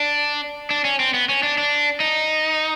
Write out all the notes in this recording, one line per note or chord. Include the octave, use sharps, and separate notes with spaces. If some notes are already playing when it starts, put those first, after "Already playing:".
Already playing: D4
D4
C#4
C4
B3
C#4
D4
D4
D#4